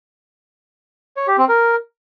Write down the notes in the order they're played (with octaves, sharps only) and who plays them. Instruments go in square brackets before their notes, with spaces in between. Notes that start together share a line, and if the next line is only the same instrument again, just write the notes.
[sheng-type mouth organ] C#5
G4
C4
A#4